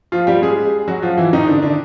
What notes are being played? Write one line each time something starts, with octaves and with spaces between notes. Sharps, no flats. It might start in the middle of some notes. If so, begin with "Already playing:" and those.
F3 F4
G3 G4
G#3 G#4
F#3 F#4
F3 F4
E3 E4
D#3 D#4
D3 D4
D3 D4